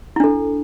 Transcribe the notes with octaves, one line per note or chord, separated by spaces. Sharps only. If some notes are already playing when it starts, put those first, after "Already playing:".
D4 E4 A4